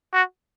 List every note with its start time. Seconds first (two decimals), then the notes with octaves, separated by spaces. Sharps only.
0.13 F#4